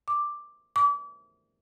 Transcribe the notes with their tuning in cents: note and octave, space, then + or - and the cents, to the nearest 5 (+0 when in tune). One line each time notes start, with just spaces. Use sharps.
D6 +5
D6 -35